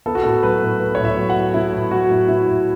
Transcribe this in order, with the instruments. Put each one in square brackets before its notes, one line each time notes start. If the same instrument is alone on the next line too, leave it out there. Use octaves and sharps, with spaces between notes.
[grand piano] B3 A4
F#4
A2 A4
F#3 B4
A2
B3
A2 C#5
E5
F#3
F#5
A2
B3 E4
A2
F#3 F#4
A2
B3 E4
A2